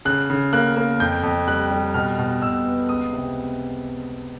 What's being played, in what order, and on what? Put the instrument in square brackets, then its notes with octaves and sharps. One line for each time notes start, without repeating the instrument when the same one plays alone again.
[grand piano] C#3 F#6
C#3
A#3 F#6
A#3
F2 G6
F2
G3 F#6
G3
B2 F6
B2
B2 E6
B3
C#2 D#6
C3